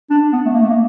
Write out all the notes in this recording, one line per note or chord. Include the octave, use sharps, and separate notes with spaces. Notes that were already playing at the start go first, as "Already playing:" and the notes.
D4
B3
A3
A#3
A3
A#3